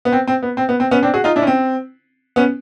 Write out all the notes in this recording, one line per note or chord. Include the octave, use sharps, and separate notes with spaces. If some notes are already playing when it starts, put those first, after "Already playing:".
B3
C4
C4
B3
C4
B3
C4
B3 C#4
C4 D4
F#4 G#4
D#4 F4
D4 E4
C#4
C4
B3 C#4